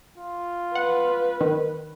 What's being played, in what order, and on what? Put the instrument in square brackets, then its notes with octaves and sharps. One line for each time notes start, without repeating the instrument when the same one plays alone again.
[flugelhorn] F4
[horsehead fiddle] B4 [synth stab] F#5
[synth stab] D#3